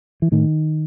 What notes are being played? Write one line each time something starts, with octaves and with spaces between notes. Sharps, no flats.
E3
A2 D#3